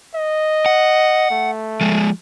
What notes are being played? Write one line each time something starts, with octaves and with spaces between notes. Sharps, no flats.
D#5
F#5
A3
F3 G#3